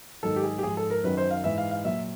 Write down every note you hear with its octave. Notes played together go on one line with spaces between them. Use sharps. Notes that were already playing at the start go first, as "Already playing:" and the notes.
G#2 D#3 F#3 A4
G4
G#4
G4
G#2 F3 G#4
A4
A#4
F#2 D#3 F#3 B4
C5
F5
G#2 E3 E5
F5
F5
A#2 F#3 E5